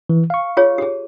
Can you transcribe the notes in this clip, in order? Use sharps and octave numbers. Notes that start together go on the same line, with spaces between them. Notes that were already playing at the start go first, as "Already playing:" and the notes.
E3
F5 C#6
F4 G#4 C#5
G4 G#4